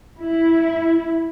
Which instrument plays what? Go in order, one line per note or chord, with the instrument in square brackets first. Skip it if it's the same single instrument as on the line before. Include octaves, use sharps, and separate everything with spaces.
[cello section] E4